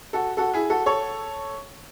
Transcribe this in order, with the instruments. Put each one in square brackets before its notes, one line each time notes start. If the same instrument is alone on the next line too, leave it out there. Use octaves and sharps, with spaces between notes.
[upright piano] F#4 A4
F#4 A4
E4 G#4
F#4 A4
A4 C#5